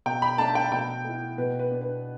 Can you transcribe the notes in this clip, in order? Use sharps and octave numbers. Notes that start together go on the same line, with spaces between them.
B2 G5
B5
A3 D4 A5
G5
B2 G5
A3 E4
B2 B4
B4
B3 D4
B4